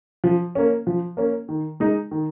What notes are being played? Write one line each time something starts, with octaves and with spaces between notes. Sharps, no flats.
F3
A#3 C#4
F3
A#3 C#4
D#3
G#3 D#4
D#3